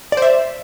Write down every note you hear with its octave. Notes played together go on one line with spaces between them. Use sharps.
C5 D5 E5